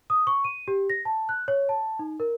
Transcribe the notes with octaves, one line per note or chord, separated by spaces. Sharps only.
D#6
C#6
D#7
G4
A#6
A5
F#6
C#5
A5
D#4
A#4